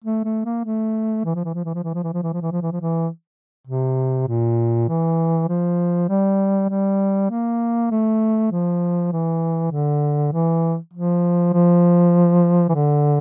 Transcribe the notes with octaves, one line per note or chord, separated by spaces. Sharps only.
A3
A3
A#3
A3
E3
F3
E3
F3
E3
F3
E3
F3
E3
F3
E3
F3
E3
F3
E3
F3
E3
C3
A#2
E3
F3
G3
G3
A#3
A3
F3
E3
D3
E3
F3
F3
E3
D3